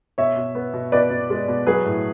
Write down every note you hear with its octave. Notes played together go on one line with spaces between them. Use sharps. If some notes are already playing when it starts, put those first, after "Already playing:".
B2 C#5 E5
B2
B3
B2
B2 B4 D5
B2
G#3
B2
F#3 G#4 B4
A2